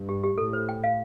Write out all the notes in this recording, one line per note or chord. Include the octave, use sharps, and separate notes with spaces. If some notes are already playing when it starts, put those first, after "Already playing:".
Already playing: G2
G4
G4
A2 A4
C5
G5
F5